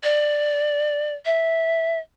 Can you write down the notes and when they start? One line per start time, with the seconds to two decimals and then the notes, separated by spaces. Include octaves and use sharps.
0.03 D5
1.25 E5